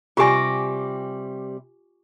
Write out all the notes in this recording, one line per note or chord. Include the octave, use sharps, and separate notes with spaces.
C3 G3 F4 G4 G#5 C#6 D6 A#6